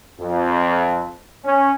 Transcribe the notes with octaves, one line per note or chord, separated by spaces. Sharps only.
F2
C#4